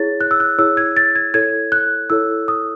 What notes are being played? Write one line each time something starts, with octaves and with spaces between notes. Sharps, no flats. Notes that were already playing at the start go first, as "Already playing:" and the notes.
Already playing: E4 G#4 C#5 A6
F#6
E6
F#6
E4 G#4 C#5 E6
G#6
A6
G#6
E4 A4 C#5 G#6
F#6
E4 A4 C#5 E6
D#6